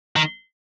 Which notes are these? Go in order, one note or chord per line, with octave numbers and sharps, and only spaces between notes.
D#3